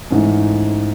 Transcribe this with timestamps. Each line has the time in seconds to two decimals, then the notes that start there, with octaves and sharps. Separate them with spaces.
0.10 G#2 E3 A3 C#4